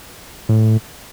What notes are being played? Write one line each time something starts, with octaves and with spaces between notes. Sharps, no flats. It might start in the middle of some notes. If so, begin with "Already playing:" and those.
A2